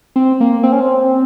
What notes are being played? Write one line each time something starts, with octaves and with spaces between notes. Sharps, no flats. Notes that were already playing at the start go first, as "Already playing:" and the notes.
C4
A#3
C4
C#4
C4